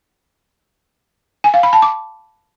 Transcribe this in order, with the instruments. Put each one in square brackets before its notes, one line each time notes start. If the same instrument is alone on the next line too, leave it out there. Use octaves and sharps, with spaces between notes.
[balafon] G#5
F5
B5
A5
D6